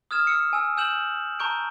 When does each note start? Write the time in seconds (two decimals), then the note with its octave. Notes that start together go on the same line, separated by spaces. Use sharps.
0.11 D#6 F6 G#6 E7
0.27 E6 F6 C#7
0.53 G#5 E6
0.77 G#5 E6 G6 E7 F#7
1.39 A5 A#5 C#6 G6 D7